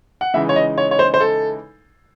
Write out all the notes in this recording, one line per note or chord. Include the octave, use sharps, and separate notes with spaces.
F#5
C#3 E3 G#3 D#4 E5
C#5
D#5
C#5
C#5
C5
C5
A4